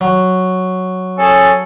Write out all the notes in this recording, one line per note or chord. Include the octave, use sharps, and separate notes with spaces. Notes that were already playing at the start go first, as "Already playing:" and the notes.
F#3
C#4 G#4 A4